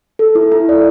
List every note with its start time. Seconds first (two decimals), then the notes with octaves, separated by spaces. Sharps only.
0.19 A4
0.35 E4
0.52 E4
0.69 D5